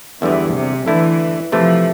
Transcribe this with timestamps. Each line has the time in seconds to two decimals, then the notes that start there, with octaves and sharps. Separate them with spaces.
0.22 E2 D3 E3 G3
0.55 C3
0.86 D3 E3 A3 E4 A4
1.52 C3 E3 F3 A3 E4 A4